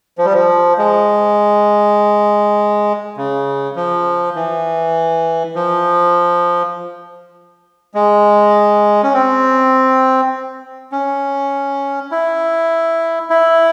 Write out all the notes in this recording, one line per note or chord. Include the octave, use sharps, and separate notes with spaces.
F3
G3
F3
G#3
C#3
F3
E3
F3
G#3
C#4
C4
C#4
E4
E4